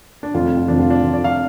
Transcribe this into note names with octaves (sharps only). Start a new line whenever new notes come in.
D4
F1 F2 F3 F4
F4
F1 F2 F3 D4
F4
D4
F1 F2 F3 F4
D5
F5